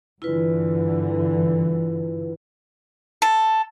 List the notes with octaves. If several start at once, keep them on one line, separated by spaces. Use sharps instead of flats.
G2 D3 E3 E4 F4 B4
A4